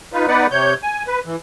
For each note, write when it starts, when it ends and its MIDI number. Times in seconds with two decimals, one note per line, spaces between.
0.13 0.26 63
0.13 0.26 65
0.13 0.26 71
0.28 0.46 59
0.28 0.46 63
0.28 0.46 71
0.28 0.46 74
0.28 0.46 78
0.51 0.74 48
0.51 0.74 73
0.51 0.74 91
0.83 1.03 80
1.07 1.19 71
1.26 1.36 52